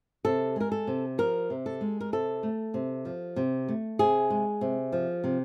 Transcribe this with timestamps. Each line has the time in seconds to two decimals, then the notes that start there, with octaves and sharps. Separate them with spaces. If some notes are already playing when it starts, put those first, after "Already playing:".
0.25 C3 A4
0.56 G#3 A#4
0.72 A4
0.87 C3
1.18 F3 A#4
1.50 C3
1.66 A4
1.81 G#3
2.00 A#4
2.13 C3 A4
2.43 A3
2.74 C3
3.05 F3
3.36 C3
3.68 A3
3.99 C3 G#4
4.30 G#3
4.61 C3
4.92 F3
5.24 C3